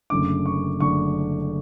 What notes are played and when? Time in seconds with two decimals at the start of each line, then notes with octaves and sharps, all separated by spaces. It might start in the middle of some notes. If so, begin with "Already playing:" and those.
0.10 F#1 F#2 D3 A3 D4 D6
0.46 C#6
0.80 F#1 F#2 D3 A3 D4 C#6